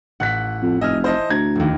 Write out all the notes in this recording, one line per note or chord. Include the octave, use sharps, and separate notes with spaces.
A1 F#5 F#6 B6
F2
F1 D#5 E5 G#5 F6
E4 C5 D#5 A5
D2 A#5 G#6
F1 D#2